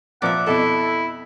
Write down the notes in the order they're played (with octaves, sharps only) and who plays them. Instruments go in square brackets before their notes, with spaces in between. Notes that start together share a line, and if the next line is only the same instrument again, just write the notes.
[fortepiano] A#2 F3 [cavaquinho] D5 E5 [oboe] F#5
[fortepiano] F2 B2 [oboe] E4 [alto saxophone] A4